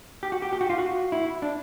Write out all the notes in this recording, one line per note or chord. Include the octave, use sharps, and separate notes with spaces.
G4
F#4
G4
G4
F#4
F4
F#4
E4
D4